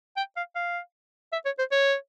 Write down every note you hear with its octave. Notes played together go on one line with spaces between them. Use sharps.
G5
F5
F5
E5
C#5
C5
C#5